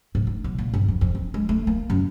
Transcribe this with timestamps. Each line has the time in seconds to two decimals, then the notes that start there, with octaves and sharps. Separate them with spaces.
0.15 A2
0.27 D#4
0.44 B1
0.58 A#2
0.74 G1
0.88 F2
1.01 F2
1.15 C4
1.34 G#3
1.49 A3
1.67 A#3
1.90 F#2